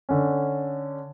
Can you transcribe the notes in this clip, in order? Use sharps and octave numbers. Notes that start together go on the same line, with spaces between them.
D3 C#4